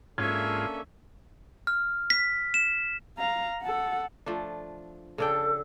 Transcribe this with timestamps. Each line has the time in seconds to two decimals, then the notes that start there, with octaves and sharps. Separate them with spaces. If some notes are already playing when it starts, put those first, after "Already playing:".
0.18 G#2 A#3 C#4 D4 F4 A4 E5 G#6
1.67 F6
2.10 B6
2.54 E7
3.18 F5 A#5
3.62 A4 F#5
4.26 F3 A3 D4
5.18 C#3 D4 A4 G5